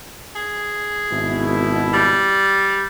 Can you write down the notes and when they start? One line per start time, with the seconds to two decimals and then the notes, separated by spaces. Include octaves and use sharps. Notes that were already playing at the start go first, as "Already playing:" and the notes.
0.36 G#4
1.11 G#1 B2 E4
1.93 G3